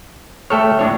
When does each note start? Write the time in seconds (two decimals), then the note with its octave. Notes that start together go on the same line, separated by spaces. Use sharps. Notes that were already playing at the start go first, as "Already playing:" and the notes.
0.50 A3 A4 C#5 E5 G5 F6
0.79 A#1 A2 D4 C#5